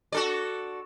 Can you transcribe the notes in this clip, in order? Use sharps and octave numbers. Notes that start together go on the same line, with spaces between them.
F#4 A4 D5